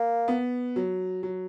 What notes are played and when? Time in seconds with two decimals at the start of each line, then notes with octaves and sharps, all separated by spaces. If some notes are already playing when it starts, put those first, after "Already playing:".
Already playing: A#3
0.28 B3
0.76 F#3
1.23 F#3